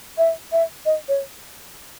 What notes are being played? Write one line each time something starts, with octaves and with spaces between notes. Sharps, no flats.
E5
E5
D#5
C#5